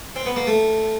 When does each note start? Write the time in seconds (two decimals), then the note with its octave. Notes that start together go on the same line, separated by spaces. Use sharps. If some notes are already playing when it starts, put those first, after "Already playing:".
0.16 C4
0.26 B3
0.36 A#3
0.47 A3